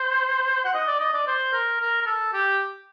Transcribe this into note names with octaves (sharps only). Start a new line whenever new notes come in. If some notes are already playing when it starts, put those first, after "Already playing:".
Already playing: C5
F#5
D#5
D5
D#5
D5
C5
A#4
A#4
A#4
A4
G4